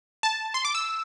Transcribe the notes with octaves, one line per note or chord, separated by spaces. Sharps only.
A5
C6
D6
E6